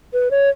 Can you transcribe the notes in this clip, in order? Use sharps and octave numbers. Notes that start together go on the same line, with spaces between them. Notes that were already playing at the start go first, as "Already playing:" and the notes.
B4
C#5